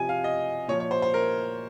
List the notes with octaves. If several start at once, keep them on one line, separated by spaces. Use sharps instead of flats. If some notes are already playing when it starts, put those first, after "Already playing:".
Already playing: C3 F3 G#5
F5
D#5
A#2 F3 C#5
C#5
C5
C5
A#4